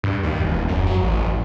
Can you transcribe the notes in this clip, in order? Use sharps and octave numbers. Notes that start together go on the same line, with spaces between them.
G2
D#2
E1
F#2
F#3
A1